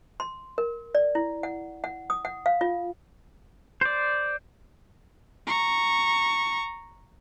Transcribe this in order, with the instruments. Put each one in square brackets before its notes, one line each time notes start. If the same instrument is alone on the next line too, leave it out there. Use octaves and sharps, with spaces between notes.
[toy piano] C6
A#4
D5
E4
F#5
F#5
D#6
F#5
F5
F4
[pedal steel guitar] C5 D5
[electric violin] A#5 C#6